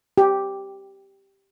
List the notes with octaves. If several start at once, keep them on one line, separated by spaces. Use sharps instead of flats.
G4